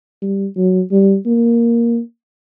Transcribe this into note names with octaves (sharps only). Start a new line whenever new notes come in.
G3
F#3
G3
A#3